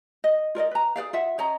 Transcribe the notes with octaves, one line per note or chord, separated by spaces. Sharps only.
D#5
F4 A#4 D5 D#5
B4 A#5
G#4 B4 D5 F5
F4 E5 F#5
C#4 C#5 D#5 A#5